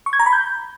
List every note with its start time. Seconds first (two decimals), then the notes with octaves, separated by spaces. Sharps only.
0.06 C#6
0.13 G#6
0.19 A#5
0.26 B5
0.33 G6